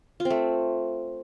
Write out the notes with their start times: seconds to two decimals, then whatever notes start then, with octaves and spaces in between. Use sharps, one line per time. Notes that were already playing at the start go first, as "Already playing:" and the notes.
0.20 F4
0.25 C4
0.30 A3